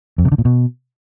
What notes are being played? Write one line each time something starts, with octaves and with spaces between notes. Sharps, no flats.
F2
C3
D3
A#2
B2